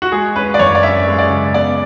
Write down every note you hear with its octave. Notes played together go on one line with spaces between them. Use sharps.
F#4
G#3 G#4
C#4 B4
D5
F#2 C#5
D5
C#4 E5
G#3
D5
C#3
B3 D5